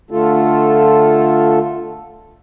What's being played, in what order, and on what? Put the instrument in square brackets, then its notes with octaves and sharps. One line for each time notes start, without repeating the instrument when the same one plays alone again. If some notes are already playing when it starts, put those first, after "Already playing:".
[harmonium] D3 A3 F4 A4